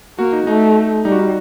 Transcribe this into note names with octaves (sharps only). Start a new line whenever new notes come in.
A#3 F#4
D#4
A3 D#4
G3 D#4
F#4
D#4